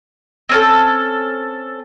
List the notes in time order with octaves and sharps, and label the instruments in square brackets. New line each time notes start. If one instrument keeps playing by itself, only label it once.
[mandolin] C4 C#4 A4